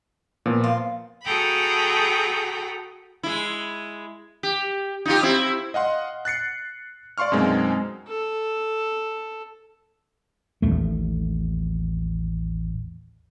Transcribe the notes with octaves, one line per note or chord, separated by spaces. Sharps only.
A#2 F3 B3
F4
F#4 G#4 A4 G5 A#5 B5
G#3 E4
G4
D#4 F4 G4
C4 E4
D#5 F5 F#5 C6
F#6 A6 C7 C#7
D5 F5 C6 C#6 F6
F#2 B2 G#3 C4 D#4
A4
A1 D#2 A3